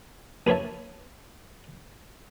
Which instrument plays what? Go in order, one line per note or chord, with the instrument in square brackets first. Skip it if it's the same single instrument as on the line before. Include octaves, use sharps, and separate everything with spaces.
[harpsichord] A#1 B4 C#5 E5 A5